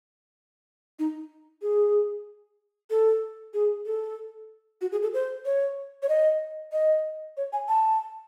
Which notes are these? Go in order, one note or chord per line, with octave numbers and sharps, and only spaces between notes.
D#4
G#4
A4
G#4
A4
F#4
G#4
A4
C5
C#5
C#5
D#5
D#5
C#5
G#5
A5